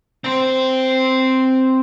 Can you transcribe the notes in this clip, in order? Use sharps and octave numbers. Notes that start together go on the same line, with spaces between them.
C4 C5